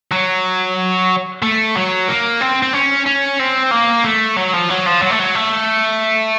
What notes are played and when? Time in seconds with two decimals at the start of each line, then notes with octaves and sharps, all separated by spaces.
0.12 F#3
1.42 A3
1.76 F#3
2.08 A#3
2.41 C4
2.62 C4
2.73 C#4
3.06 C#4
3.40 C4
3.71 A#3
4.04 A3
4.37 F#3
4.53 F3
4.69 F#3
4.86 F3
5.02 F#3
5.11 A3
5.19 F#3
5.35 A3